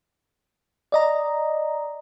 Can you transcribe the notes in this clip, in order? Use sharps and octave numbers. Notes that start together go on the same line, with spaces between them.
D5 D#5 A#5